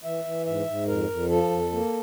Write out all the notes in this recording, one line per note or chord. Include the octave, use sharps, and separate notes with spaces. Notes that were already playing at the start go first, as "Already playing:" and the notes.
E3 E5
E3
G#2 E5
G#2
F2 A#4
F2
F3 A4
F2
A#3